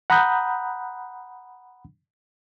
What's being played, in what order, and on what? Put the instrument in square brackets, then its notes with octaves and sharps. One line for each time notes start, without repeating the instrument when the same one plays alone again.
[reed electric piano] F#5 A#5 B5 D#6 F#6 G6